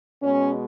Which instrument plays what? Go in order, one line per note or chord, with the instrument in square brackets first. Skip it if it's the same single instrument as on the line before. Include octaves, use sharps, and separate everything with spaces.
[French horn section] B2 G#3 C#4